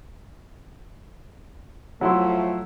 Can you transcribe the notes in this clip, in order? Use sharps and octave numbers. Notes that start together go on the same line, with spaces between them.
A2 F3 F#3 A3 E4 C6